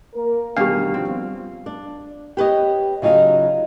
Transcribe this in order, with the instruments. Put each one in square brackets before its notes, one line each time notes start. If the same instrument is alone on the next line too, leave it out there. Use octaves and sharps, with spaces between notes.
[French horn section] A#3 A#4
[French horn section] D2 D#3 [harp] B2 G3 [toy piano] D4 G4 [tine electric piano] F5
[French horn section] F3 [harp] C4
[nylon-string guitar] D4
G4 B4 C#5 D#5
C#3 F#3 D#4 F4 F5